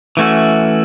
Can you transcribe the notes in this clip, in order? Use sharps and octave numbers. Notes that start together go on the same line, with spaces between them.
E3 A3 C#4 F#4